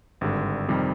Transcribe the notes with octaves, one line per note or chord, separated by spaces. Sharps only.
G#1 G2 D3
F2 C3 D#3 G3